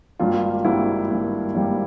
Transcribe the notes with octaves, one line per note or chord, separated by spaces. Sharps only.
G#1 G2 G3 A#3 F4
G#1 G2 G3 A#3 E4
G#1 G2 G3 A#3
G#1 G2 G3 A#3